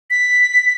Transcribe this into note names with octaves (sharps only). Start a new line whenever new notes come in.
B6